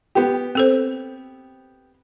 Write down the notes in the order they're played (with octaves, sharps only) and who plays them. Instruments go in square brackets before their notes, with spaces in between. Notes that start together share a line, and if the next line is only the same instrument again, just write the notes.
[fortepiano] B3 G4
[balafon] C4 A4 C5